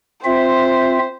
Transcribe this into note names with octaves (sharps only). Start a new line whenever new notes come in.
C4 F4 C5 E5